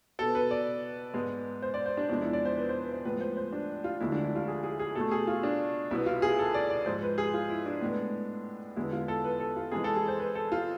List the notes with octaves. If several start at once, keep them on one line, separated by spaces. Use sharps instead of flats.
B2 B3 A4
B4
D5
G#2 G#3 B3
C5
D5
C5
D4
E2 C3 F3 G#3 D4
E4
D5
C5
B4
C5
B4
C5
A2 F3 G#3 B3 B4
C5
C5
D4
F4
D2 D3 F3 G#3 E4
D4
E4
F4
G#4
G#4
G#4
B2 A3 A4
G#4
F4
D4
C2 B2 B3 E4
F4
G#4
A4
D5
D5
G#2 F3 G#3 C5
B4
G#4
F4
E4
D4
A2 G#3 B3
E2 D3 G#3 B3 E4
F4
A4
B4
A4
F4
F2 C3 E3 G#3 G#4
A4
G#4
C5
B4
A4
F4